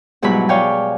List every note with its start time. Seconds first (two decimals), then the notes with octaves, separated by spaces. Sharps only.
0.22 G#2 B2 F#3 G3 E4 B5
0.49 C#5 D5 F5 G5 G#5